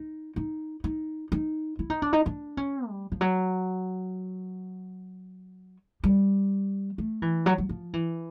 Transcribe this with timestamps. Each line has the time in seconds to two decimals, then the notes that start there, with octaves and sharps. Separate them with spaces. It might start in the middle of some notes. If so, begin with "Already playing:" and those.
Already playing: D#4
0.36 D#4
0.84 D#4
1.32 D#4
1.79 E4
1.90 D#4
2.02 D4
2.13 D#4
2.26 D4
2.57 C#4
2.88 G3
3.12 F3
3.21 F#3
6.04 G3
6.98 A3
7.22 E3
7.46 F#3
7.58 F#3
7.69 F3
7.93 E3